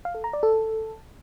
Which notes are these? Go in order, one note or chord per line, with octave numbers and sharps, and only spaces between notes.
F5
A4
A#5
D5
A4